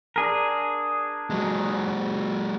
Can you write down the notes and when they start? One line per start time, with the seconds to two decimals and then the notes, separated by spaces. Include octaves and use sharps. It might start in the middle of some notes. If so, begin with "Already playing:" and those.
0.16 D4 G#4 A#4
1.30 F#3 G#3